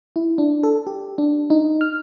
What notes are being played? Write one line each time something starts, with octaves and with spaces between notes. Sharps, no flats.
E4
D4
A4
G4
D4
D#4
F6